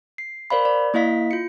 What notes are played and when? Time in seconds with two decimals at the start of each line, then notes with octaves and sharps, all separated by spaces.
0.18 C7
0.50 A#4 C5 D5 F5 B5
0.65 D5
0.94 A#3 E4 D#5 F5 B6
1.31 F4 C#7